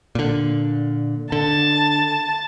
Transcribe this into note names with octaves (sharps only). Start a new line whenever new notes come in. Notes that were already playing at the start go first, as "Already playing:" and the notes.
A#2 D3
D3 A5